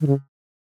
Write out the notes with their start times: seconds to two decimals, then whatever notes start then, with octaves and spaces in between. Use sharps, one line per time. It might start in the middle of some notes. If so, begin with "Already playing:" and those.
0.01 D#3
0.07 C#3